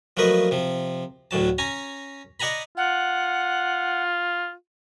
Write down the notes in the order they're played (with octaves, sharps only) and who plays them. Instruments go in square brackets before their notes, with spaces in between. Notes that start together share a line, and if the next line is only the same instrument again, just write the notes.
[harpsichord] F3 F#3 A3 A#3 B4 D#5
C3 F3
D2 A2 F#3 A5
C#4 G#5 A#5
D5 D#5 F#5 G#5 A#5 B5
[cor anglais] F4 [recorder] F#5